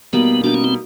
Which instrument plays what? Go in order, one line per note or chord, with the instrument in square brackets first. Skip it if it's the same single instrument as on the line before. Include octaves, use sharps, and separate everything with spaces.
[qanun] B2 G3 A#3 D#4 [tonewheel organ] B3
[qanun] B2 G3 A#3 D#4 [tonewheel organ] D4
[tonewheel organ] C#4
C4